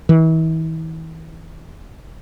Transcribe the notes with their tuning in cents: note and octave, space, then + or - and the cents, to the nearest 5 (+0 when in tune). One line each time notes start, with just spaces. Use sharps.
E3 -40